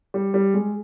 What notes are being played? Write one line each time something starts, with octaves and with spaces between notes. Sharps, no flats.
G3
G3
G#3